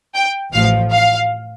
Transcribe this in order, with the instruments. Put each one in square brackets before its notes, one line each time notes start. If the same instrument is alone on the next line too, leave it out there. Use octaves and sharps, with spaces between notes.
[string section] G5
A1 A2 F3 F5
F5